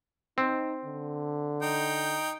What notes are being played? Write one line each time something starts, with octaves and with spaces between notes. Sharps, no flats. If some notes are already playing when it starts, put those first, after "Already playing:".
C4 D#4
D3
D#4 G5